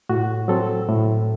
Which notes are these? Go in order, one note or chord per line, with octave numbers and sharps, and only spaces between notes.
A2 F#4
F#3 C4 A4
A2